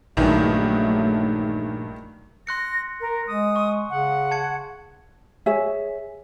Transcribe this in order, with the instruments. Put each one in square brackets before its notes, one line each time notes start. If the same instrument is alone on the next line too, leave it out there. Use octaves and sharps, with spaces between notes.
[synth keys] A#1 A#3 G#4 [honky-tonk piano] G2 D#3 E3 [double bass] F#3 A3
[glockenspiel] C6 F#6 C#7 [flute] A#6
[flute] A#4
[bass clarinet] G#3 [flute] D#6
[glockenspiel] C#6
[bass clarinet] C#3 [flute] F#5
[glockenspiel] A5 G#6 C#7
[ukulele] G#4 C#5 E5